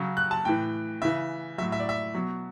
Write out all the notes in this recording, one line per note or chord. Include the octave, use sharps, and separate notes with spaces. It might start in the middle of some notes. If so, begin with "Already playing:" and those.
Already playing: C#3 F#3
F#6
A5
A2 E3 G5
C#3 E3 E5
A2 F#3 E5
E5
D5
E5
B2 F#3